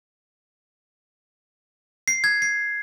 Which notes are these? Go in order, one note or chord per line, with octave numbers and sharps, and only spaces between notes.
C7
G#6
C7